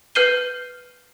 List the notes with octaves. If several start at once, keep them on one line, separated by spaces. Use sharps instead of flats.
B4 F6 G6 C7 D#7 G7